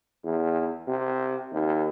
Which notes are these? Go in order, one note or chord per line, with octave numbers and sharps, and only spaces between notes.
E2
C3
D#2